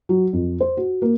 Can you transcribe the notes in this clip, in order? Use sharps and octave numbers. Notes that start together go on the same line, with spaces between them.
F#3
F2
C5
F#4
A#3